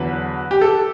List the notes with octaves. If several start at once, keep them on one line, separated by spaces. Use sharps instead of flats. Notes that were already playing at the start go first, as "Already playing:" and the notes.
Already playing: E2 D3 F#3 B4
G4
A4